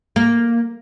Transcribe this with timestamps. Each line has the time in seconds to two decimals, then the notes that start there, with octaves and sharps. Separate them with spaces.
0.16 A#3